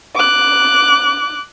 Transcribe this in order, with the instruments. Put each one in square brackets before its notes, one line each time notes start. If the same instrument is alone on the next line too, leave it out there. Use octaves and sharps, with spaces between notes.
[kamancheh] D6 F#6